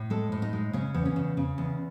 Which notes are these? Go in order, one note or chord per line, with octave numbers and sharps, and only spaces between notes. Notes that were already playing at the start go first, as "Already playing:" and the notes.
Already playing: A2
G#3 A4
A2
D#4
G#3
C#3 C#4
E2
C#4
C#3
C#3
E2